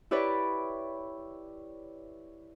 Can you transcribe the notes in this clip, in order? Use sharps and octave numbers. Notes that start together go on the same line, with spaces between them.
E4 G4 B4 C#5 D5